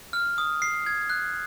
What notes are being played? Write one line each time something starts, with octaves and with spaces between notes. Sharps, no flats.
F6
D#6
C7
G#6
F#6